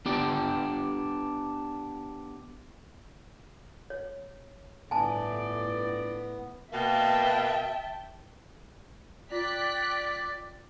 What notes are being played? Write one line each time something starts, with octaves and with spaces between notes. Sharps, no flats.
B3 D4 G4 G5
C#5
G1 A2 B3 D5 G#5 A5
B2 A#3 E5 G5 A5
F4 D5 G5 F#6 B6